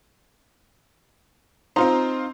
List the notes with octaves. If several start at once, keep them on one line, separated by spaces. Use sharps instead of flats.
C4 D#4 F4 C5 A#5